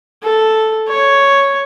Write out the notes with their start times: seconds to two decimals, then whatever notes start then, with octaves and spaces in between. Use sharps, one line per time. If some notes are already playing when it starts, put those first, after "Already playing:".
0.23 A4
0.89 C#5